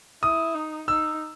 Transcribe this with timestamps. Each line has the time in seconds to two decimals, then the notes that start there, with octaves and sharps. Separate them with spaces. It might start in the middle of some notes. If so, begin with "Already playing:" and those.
0.22 E4 D#6
0.55 D#4
0.88 D#4 E6